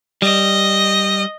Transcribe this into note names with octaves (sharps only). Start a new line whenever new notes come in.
G3 D#5